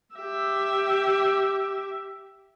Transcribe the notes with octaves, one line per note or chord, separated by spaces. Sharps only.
G4 E5